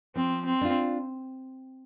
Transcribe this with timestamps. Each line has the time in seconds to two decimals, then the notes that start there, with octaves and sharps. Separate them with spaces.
0.15 F3 C4
0.45 C4
0.61 D4 F4